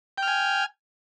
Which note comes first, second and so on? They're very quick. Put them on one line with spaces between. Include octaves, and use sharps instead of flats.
G5 F6 G#5